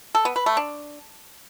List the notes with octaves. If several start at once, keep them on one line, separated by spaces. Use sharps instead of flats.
A4
B3
B4
A3
D4